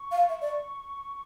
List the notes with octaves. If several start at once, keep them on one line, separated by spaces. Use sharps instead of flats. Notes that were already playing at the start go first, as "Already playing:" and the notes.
Already playing: C#6
F5
E5
D5